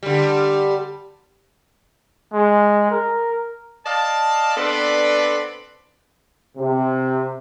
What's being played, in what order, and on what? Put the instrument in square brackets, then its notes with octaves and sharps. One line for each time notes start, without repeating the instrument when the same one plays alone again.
[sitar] D3 G3
[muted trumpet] G#3
A#4
[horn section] D5 D#5 F5 A5
B3 C4 D4 A4 B4 D5
[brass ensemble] C3